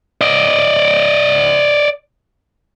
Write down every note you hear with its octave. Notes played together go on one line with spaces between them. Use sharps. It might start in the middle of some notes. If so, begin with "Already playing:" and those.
D5 D#5